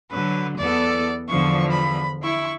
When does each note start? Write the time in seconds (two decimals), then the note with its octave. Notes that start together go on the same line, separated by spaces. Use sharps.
0.12 D3 F#3 B4
0.58 E2 B3 A4 D5
1.29 E2 D3 F3 C#6
1.71 B5
2.23 E4 C#6